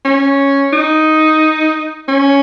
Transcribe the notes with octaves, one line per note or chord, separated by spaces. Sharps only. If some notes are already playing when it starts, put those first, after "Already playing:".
C#4
D#4
C#4